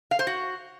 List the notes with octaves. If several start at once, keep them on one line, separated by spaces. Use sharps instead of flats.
F5
C5
F#4